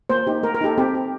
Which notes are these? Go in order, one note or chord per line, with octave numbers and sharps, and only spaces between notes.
A#3 C5
D#4 G4
A#3 A#4
A#4
D#4 G4 A4
C4 G4
G4